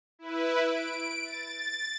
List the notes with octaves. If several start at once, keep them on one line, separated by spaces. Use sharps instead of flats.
E4 B4
D7
A6